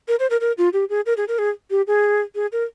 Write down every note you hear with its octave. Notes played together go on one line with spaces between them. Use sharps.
A#4
C5
A#4
A#4
F4
G4
G#4
A#4
G#4
A#4
G#4
G4
G#4
G#4
A#4